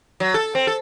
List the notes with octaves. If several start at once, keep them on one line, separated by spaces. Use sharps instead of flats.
F#3
A4
C4
A4